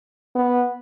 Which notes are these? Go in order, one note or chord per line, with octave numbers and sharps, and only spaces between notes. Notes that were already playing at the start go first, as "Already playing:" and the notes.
B3